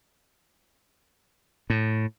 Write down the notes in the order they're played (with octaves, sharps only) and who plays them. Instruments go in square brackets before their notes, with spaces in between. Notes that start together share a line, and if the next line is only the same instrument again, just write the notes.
[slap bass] A2